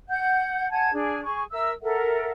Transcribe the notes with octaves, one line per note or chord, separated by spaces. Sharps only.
F#5 G6
F#5 G#5 A5 G#6
D4 G#4
G#4 C#6
A#4 E5 E6
A4 A#4 E5 F#5